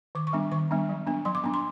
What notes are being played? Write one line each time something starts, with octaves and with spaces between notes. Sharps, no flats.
D#3 D6
C#6
G3 B3 D4
D#3 C#6
G3 B3 D4
F#3
B3 D4
F#3 C6
D6
B3 D4
C6